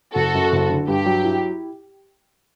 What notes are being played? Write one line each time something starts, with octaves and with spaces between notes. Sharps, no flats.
F#1 F#4 A4
F#2
F#1
D3
G2 G4
F#3
E4